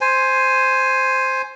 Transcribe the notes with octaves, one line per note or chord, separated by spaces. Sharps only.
C5 G#5